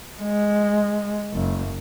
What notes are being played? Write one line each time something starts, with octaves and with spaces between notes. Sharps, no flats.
G#3
F#1